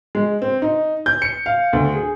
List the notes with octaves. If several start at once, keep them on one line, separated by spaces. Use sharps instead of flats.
G#3
C4
D#4
G6
C#7
F5
D2
G#4